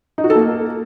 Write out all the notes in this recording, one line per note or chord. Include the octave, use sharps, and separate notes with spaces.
D#4
F#4
A4
A#3